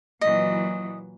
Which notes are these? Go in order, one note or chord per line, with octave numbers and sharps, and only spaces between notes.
A#2 E3 F#3 D#5